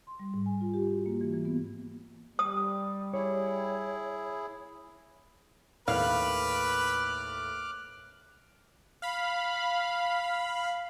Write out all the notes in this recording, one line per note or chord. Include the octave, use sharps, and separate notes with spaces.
C6
G3
G#2
G#5
F4
G4
F#4
A#3
E3
E3
B3
G3 D#6
E4 G#4 C#5
D#2 A2 B4 F5 D6 F6 F#6
F5 B5